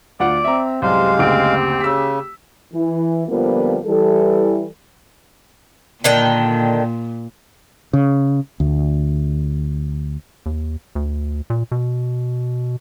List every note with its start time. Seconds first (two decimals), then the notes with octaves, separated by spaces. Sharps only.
0.20 D2 F4 D5 F#5
0.44 C4 E5 A#5
0.82 C2 F#2 G#3 G4 C5 F5
1.19 F#1 D2 C4 D7
1.81 C#3 E6 B6
2.73 E3
3.28 F2 D3 F3 G3 A#3 B3
3.85 E3 G3 A4
6.04 A#2 D3 D#3 G5
7.93 C#3
8.60 D2
10.46 D#2
10.95 D2
11.50 A#2
11.72 B2